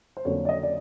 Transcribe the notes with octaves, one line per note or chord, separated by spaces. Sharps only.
C5
F2 D3 F#3 A#3 C#4 C#5
D5
D#5
D5